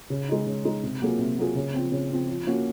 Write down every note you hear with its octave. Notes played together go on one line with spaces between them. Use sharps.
C#3
G#3 D#4
C#3
G#3 D#4
C3
F#3 A#3 F4 G#4
C3
F#3 A#3 F4 G#4
C#3
F3 C4
C#3
F3 C4
F3
A#3 C#4 F#4